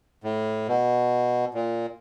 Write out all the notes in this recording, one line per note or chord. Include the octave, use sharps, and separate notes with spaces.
A2
B2
A#2